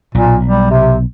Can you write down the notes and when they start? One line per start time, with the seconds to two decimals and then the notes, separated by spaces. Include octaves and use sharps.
0.15 B1 A#2
0.46 G3
0.70 C3